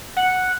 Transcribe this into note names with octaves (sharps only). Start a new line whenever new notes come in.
F#5